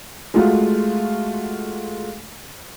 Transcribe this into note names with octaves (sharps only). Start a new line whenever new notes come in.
G#3 A3 F4 F#4